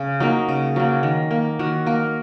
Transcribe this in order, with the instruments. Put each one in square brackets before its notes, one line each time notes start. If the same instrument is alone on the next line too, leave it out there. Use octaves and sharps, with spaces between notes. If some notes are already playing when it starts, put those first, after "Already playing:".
Already playing: [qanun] C#3
F#3 A#3 D#4
C#3
F#3 A#3
D#3
A#3
D#3 F#4
A#3 A#4